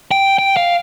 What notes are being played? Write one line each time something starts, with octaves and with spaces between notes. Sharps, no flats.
G5
G5
F5